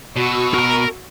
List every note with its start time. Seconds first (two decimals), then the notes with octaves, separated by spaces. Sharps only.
0.16 B2 F#4 C#6 E6
0.54 A#4 A#5